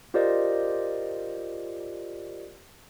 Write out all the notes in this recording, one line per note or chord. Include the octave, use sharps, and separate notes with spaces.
F4 G4 A#4 C5 D5 D#5